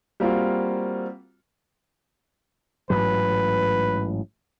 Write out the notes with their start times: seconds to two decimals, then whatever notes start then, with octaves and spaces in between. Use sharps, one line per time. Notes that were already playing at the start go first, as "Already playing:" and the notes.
0.20 G3 A#3 C4 F4 F#4
2.90 A1 G#2 F#3 B4